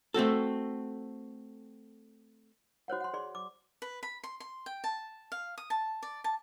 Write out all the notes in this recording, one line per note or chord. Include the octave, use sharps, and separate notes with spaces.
A3 C4 F#4 A4
F#4 C5 C#5 F#5
F#5 C6
G#4 D5 C6
D6
B4
B5
C6
C6
G5
A5
F5
D#6
A5
D5
A5